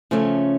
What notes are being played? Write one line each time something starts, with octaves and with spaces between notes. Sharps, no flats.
C#3 F3 A3 C#4